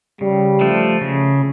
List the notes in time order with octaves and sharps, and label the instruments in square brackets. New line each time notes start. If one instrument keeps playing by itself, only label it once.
[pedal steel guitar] C#3 [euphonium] G3
[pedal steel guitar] F3 A3
C#3